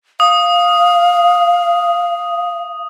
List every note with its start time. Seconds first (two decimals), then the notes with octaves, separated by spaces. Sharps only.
0.20 F5 D#6